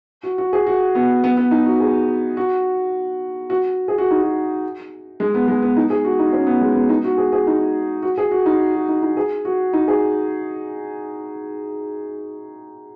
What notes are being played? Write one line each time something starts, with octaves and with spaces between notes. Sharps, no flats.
F#4
F#4
G#4
F#4
B3
B3
B3
D#4
F#4
G#4
F#4
F#4
G#4
F#4
D#4
F#4
G#3
B3
G#3
B3
D#4
G#4
F#4
D#4
C#4
B3
G#3
B3
D#4
F#4
G#4
G#4
D#4
F#4
G#4
F#4
D#4
F#4
D#4
D#4
G#4
F#4
D#4
G#4